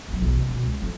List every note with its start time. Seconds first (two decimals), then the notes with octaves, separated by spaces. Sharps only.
0.08 E2 F#3
0.21 B1 E2
0.35 C3
0.49 B2 D#3
0.63 C#2
0.82 F2 F3